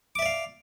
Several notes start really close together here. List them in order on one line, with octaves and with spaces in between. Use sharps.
D6 E5 D5 F5